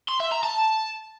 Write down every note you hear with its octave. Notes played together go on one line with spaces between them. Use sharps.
C6
E5
A#5
A5